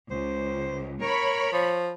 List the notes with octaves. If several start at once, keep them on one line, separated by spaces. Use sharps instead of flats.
C#2 C5
A#4 C#5 B5
F3